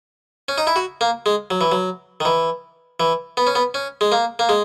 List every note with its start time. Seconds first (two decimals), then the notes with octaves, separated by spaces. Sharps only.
0.48 C#4
0.58 D#4
0.67 E4
0.76 F#4
1.01 A#3
1.26 G#3
1.51 F#3
1.61 E3
1.72 F#3
2.20 D#3
2.25 E3
3.00 E3
3.37 B3
3.47 C#4
3.55 B3
3.74 C#4
4.01 G#3
4.12 A#3
4.39 A#3
4.49 G#3